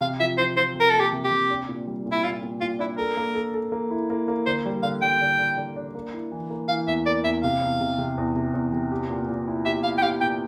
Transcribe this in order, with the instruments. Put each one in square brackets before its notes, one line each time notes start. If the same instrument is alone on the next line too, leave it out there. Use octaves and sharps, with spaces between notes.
[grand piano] C3 [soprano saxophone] F5
[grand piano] F3 [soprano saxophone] E5
[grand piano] F3 [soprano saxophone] C5
[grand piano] F3 [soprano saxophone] C5
[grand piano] C3 [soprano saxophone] A#4
[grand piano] A#3 [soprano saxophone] A4
[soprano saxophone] G4
[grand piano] C3
[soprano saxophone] G4
[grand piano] C3
D4
A#2
G3
A#2
[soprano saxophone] E4
[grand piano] A#2 [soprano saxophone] F4
[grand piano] A#2
[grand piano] A#2 [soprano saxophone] F4
[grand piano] D4 [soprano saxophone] E4
[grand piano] A4 [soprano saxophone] A#4
[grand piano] A#3
A4
A4
A#3
E4
A#3
A#3
[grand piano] D3 [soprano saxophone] C5
[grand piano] G3
[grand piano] D3 [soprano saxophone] F5
[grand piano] G3 [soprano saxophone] G5
[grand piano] D3
D3
D3
D4
A#3
E4
E3
A#3
[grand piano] E3 [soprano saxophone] F5
[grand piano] E2 [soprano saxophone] E5
[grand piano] A#3 [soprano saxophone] D5
[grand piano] E2 [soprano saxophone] E5
[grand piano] C3 [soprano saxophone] F5
[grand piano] E2
C3
C3
E2
C3
E2
C3
G4
A#2
A#2
E4
[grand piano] G4 [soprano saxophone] E5
[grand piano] E4 [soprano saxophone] F5
[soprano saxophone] G5
[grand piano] G4 [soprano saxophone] F5
[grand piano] A#2 [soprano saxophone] G5